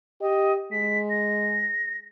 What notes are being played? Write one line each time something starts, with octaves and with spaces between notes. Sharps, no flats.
G4 D#5
G#3 B6
A#6